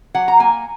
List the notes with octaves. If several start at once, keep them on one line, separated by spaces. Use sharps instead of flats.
F#3 F#5
A#5
A#3 G#5